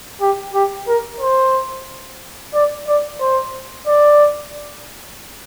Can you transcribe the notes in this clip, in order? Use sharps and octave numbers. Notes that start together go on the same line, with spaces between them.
G4
G4
A#4
C5
D5
D5
C5
D5